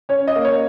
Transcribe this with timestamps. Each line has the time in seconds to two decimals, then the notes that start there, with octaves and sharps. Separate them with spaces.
0.09 C#4 C#5
0.27 D#5
0.36 A#3
0.45 C#5